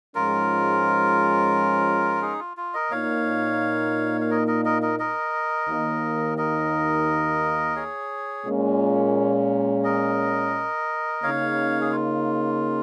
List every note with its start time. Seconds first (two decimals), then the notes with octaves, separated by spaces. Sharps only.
0.15 G#2 F3 G#3 C#4 F4 A#4
2.22 D#4 G#4
2.39 F4
2.57 F4
2.74 A#4 D#5
2.91 A#2 A#3 D#4 C#5 F5
4.21 F5
4.30 A#4 D#5
4.47 A#4 D#5
4.65 A#4 D#5
4.82 A#4 D#5
4.99 A#4 D#5
5.68 D#2 D#3 A#3
6.38 A#4 D#5
7.76 G#4 C#5
8.46 A#2 G#3 C#4
9.84 A#4 D#5
11.23 C#3 A#3 D#4 C#5 F5
11.81 G#4
11.92 F4